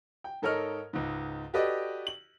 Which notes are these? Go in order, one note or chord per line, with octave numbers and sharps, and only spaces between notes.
G5
G#2 A4 A#4 C#5 D#5 F6
C#2 G#2
F#4 G4 A4 B4 D5 D#5
F#7